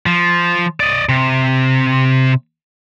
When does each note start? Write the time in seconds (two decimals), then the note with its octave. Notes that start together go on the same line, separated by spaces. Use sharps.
0.06 F3
0.80 D5 D#5
1.09 C3